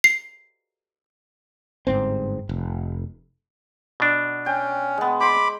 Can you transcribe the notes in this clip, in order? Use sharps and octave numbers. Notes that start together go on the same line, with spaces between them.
C7
G1 G#2 C4
F1
B2 D4
C#4 G5
G#3 B3
C5 B5 C6 D6